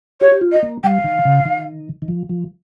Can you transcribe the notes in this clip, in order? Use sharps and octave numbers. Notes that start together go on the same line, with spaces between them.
G4 C#5
G4
F4
D#5
A#3
G3 F5 G5
D#3
C#3
D#3
D#3
F3
F3